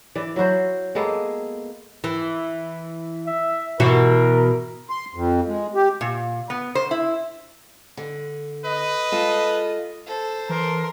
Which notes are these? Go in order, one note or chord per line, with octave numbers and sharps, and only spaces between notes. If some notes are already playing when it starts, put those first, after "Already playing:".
E3 D5
F#3 E4 F#4 C5
G#3 A#3 B3 A4
E3
E5
B2 E3 F#4 A#4
C6
F2
G#3
G4
A#2
B3
C5
E4
D3
B4 D#5
G#3 F4 A4
A4 C5
E3 A#4 C6